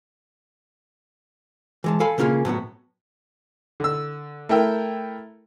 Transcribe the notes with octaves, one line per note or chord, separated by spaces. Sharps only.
E3 G#3 A5
A4 F5 G#5 B5
C#3 A#3 C#4 F4 G#4
A2 F#3 B3 F#4
D3 E6
A3 E4 A#4 G5 E6